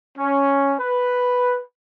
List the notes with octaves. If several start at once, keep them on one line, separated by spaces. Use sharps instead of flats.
C#4
B4